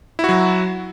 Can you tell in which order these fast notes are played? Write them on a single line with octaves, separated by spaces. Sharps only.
E4 F#4 F#3